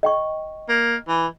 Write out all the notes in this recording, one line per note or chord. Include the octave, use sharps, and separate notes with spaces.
D#5 G5 C#6
A#3
E3